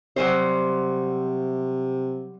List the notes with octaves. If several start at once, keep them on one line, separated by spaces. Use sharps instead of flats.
C3 F#3 G3 C5